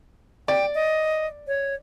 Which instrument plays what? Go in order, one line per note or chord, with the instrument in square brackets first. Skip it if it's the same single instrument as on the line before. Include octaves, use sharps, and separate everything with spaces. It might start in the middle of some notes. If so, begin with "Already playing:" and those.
[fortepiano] D5 [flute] G5
[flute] D#5
C#5